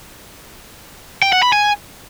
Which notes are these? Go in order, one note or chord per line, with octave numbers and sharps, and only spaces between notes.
G5
F#5
B5
G#5